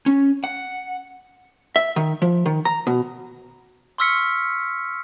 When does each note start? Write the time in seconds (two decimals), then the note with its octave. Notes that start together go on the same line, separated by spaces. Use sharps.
0.06 C#4
0.44 F#5
1.76 E5
1.96 D#3
2.22 F3
2.46 D#3
2.65 A#5
2.87 B2
3.98 C6 C#6 E6 F6 B6 C#7